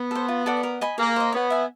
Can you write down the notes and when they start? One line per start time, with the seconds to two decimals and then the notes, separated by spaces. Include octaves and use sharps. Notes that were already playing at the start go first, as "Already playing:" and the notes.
Already playing: B3
0.11 A4 C5
0.28 F4
0.46 A4 D5 F#5
0.63 A#4
0.81 D#5 G#5 B5
0.98 A#3 G#4
1.16 C5 D#5
1.32 B3 C#5
1.50 E5 G#5